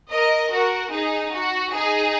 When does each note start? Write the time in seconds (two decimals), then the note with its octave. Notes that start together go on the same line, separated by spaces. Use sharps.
0.11 A#4 D#5
0.51 F#4 A#4
0.91 D#4 G#4
1.33 F#4
1.73 D#4 G#4